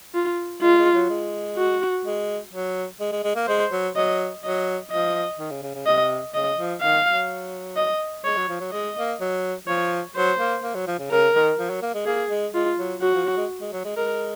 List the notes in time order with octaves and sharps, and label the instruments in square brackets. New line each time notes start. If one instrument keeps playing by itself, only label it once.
[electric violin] F4
[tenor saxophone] G#3 [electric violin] F4
[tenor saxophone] G#3
F#3
G#3
[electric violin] F#4
[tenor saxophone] G#3
F#3
G#3
G#3
G#3
A#3
[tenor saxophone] G#3 [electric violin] C5
[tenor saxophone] F#3
[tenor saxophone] F#3 [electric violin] D#5
[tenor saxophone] F#3 [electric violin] D#5
[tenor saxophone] F3 [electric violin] D#5
[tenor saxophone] D#3
C#3
C#3
C#3
[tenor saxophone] C3 [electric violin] D#5
[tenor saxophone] C#3 [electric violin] D#5
[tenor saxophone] F3
[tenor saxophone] D#3 [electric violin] F5
[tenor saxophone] F#3
[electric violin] D#5
[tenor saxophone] G#3 [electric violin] C#5
[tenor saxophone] F#3
F3
F#3
[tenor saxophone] G#3 [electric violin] D#5
[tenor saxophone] A#3
F#3
[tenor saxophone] F3 [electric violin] C#5
[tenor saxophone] F#3 [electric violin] C5
[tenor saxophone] A#3
A#3
F#3
F3
C#3
[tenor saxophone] C#3 [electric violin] A#4
[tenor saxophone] D#3
F3
F#3
A#3
G#3
[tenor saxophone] A#3 [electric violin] G#4
[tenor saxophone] G#3
[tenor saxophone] G#3 [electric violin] F4
[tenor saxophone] F#3
[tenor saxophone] F#3 [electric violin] F#4
[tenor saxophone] F3
F#3
G#3
G#3
F#3
G#3
[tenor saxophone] G#3 [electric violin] A#4